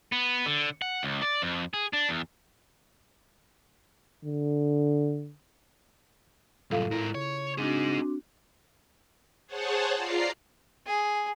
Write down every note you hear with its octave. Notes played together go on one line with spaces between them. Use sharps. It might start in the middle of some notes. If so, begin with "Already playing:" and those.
B3
D3
F#5
C#2
D5
F2
G#4
D4
E2
D3
C2 F#2 A2 F4 A4 F5
G#2 E4 A#4
C#3 C#5
C4 D4 D#4 F#4 G#4
G#4 C5 C#5 F#5 A5
F4 D5 A#5 C7
G#4